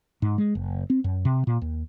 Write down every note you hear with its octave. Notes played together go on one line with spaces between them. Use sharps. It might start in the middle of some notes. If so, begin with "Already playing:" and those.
G#2
G#3
F#1
C4
F#2
C3
A#2
D#2